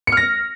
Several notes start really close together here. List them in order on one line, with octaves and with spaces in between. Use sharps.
C#7 F6 A#6